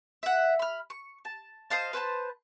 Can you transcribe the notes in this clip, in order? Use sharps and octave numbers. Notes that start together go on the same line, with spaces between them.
E5 F#5
B5 F6
C#6
A5
C5 D#5 F5 A5
B4 C5 G#5 A5